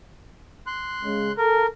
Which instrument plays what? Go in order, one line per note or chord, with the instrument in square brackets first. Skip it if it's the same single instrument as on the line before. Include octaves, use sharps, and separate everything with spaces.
[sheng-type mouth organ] C6 F#6
[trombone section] C#3 G#3
[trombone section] A4 [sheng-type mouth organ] A#4